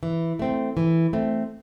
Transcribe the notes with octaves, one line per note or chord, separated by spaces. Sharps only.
E3
A3 C4
E3
A3 C4